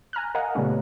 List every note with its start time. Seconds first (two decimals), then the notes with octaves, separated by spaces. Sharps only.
0.13 G#5 A#5 F6 F#6
0.35 A#4 D#5 F5 F#5 G#5 A#5
0.55 A#2 C#3 G3 A3 B3 C#4